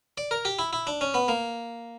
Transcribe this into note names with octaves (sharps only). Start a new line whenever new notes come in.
D5
A#4
G4
E4
E4
D4
C#4
B3
A#3